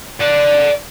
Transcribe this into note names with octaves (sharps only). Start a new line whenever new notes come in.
D5 F#5